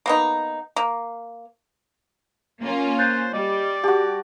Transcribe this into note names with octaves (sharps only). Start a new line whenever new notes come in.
A#3 B3 D#4
A#3
A#3 C#4 F4
C5 F#6 G6 A6
G3 D5 D#5
F#4 G4 A5